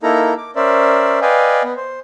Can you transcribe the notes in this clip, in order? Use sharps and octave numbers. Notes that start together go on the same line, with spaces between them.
A#3 D#4 E4 A4 A#4 A#5
D6
C#4 A#4 C5 D5 E5
B4 D5 D#5 F5 G5 G#5
B3
C5